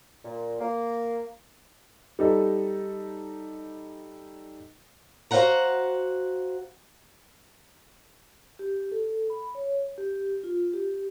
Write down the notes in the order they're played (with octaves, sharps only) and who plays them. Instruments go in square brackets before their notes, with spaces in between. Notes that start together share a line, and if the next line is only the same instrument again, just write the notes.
[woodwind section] A#2
A#3
[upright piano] G3 D#4 A4
[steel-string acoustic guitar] F#4 C5 C#5 F5 F#5 A#5
[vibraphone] G4
A4
B5
C#5
G4
F4
G4